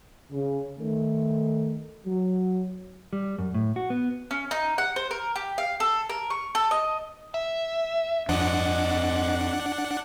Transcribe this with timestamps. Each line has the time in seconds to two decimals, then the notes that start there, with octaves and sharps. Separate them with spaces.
0.32 C#3
0.78 D#3 A3
2.06 F#3
3.13 G3
3.38 F#2
3.54 A2
3.76 F#4
3.90 B3
4.31 C#4
4.51 D#4
4.78 F#5
4.96 C5
5.11 A#4
5.36 G4
5.58 F5
5.80 A4
6.10 A#4
6.30 C#6
6.55 A4
6.71 D#5
7.34 E5
8.29 F2 D4 C5 D#5 F#5